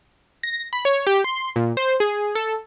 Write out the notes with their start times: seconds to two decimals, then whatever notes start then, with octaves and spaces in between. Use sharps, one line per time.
0.43 A#6
0.73 B5
0.85 C#5
1.07 G4
1.24 C6
1.56 A#2
1.77 C5
2.00 G#4
2.35 A4